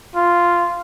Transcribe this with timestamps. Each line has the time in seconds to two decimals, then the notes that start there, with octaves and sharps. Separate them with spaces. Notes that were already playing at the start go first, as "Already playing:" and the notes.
0.15 F4